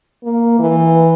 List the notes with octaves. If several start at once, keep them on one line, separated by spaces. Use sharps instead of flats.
A#3
E3